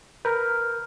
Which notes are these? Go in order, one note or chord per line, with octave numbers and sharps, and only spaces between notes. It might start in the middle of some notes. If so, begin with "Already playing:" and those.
A#4 B4 F6 G6